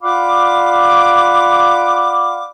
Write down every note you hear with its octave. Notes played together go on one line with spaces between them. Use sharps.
F4 D5 F5 F#5 B5 D6